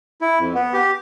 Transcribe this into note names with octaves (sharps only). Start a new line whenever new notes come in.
E4
F2
B3
G4